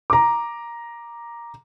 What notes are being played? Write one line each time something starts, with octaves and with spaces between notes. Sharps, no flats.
A#5 D6